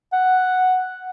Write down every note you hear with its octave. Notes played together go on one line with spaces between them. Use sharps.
F#5